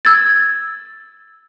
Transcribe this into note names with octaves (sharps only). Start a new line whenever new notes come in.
E6 G#6 A6